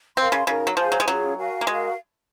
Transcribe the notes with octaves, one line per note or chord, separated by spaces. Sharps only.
C4 A#4 F5 C6
C#3
C#3 D#4 F#4 A#4
F#3
F3 G#4 C5 F5 G#5
F#3
G#3
F#3 C#4 F4 G#4 C#5
F#4 A#4 F5 G#5
A#3
G#3 F#4 A#4 F5